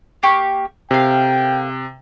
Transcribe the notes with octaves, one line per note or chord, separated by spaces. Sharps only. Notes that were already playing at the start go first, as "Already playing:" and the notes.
A#3 G4 C#6
C3 A3 A#4 F5 G5